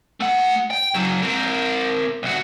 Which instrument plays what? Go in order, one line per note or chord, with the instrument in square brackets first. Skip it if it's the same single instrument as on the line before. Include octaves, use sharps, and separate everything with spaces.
[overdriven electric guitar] A3 F#5
G5
C#3 F#3
C4 A#4
C2 F#4